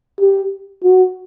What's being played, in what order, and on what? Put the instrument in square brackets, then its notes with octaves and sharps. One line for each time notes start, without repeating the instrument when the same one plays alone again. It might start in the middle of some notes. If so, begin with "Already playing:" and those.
[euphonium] G4
F#4